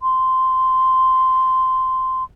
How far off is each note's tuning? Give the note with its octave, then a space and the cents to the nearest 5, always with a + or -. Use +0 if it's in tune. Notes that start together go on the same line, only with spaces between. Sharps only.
C6 -10